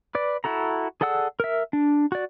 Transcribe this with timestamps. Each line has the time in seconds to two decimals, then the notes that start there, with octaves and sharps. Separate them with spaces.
0.15 B4 D5
0.44 E4 F#4 A4 A#5
1.01 G#4 A4 D5 F#5 E6
1.40 A#4 E5
1.73 D4
2.12 F#4 D5